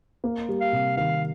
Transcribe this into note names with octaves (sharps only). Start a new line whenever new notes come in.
A#3
G3
F5
C3
D#3 F5